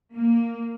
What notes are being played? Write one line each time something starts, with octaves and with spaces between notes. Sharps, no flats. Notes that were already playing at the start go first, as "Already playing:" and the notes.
A#3